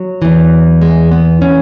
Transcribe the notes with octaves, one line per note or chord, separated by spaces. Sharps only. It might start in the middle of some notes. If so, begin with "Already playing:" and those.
Already playing: F#3
E2 E3
G#3
B3
E3 C#4